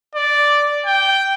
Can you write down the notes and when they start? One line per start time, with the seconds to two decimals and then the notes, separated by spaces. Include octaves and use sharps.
0.15 D5
0.86 G5